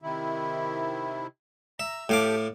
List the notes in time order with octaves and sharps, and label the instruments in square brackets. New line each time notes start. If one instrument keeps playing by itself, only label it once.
[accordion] C3 D#3 E4
[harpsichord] E5 [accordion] A#5
[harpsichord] A2 F5 D6 [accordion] G4 A4 G5